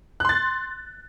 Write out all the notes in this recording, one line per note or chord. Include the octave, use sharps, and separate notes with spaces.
C6 F#6 A6